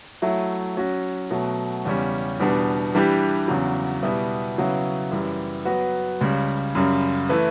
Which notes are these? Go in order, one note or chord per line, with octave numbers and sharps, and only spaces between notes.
F#3 A3 E4
F#3 C#4 F#4
B2 F#3 A3
E2 C#3 G3 C#4
E2 B2 G3 B3 D4
E3 G3 D4 G4 B4
E2 C#3 F#3
B2 G3 B3 E4
C#3 F#3 B3 E4
F#2 E3 G3
F#3 B3 F#4 B4
C#2 C#3 G3
F#2 C#3 G3
E3 A3 E4 B4